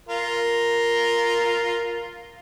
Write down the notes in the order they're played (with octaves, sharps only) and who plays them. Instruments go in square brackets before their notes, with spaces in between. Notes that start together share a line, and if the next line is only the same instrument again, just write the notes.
[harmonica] F4 A#4